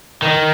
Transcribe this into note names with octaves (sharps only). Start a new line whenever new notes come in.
D#3